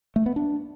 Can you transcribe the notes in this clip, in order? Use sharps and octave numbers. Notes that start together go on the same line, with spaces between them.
A3
B3
D4